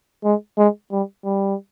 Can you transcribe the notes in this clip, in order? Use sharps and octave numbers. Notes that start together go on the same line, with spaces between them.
G#3
G#3
G3
G3